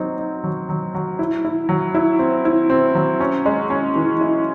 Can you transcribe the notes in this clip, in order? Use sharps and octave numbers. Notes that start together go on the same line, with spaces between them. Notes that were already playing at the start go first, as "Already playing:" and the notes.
Already playing: F#3 C4 D#4
D#4
F#3
F#3
F#3
E4
E4
F#3
E4
C4
E4
C4
F#3
C#4
G#3
C#4
E3
E4